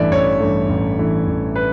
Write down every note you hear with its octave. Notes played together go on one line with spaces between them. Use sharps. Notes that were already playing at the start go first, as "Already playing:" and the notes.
Already playing: A1 G2 E3 A3 D5 E5
A1 C#5
G2 E3 A3
A1
G2 E3 A3
A1
B4